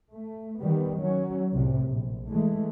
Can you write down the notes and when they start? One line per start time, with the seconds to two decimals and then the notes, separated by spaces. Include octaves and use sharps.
0.13 A3
0.62 D#3 G3 B3
1.02 F#3 C#4
1.54 C2 A2 C3
1.88 A#1
2.27 E3 G#3 A3